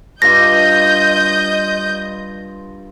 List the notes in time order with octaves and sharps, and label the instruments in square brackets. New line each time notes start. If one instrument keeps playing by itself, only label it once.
[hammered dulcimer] G2 F4 [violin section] D#5 G6 [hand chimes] A#6